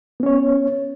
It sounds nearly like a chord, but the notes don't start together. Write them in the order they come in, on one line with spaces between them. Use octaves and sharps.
B3 C#4 C#5